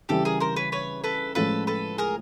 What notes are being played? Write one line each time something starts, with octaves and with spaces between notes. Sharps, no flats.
C#3 E3 G3 G4 A4
G#4 A#4
A#4 C5
B4 C#5
B4 C#5
A4 B4
A2 F3 G#3 C#4 F4 A4 B4
A4 B4
G#4 A#4